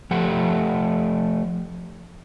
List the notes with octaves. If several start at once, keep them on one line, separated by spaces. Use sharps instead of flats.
F3 A3 G4 F#5